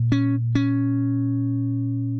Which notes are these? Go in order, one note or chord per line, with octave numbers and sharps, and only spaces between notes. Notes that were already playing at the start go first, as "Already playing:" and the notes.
Already playing: A#2
C#4
C#4